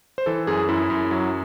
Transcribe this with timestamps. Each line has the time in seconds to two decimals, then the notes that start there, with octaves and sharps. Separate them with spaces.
0.18 C5
0.26 E3 A4
0.47 F#2 G#4
0.69 F#2 E4
0.90 F#2
1.11 F#3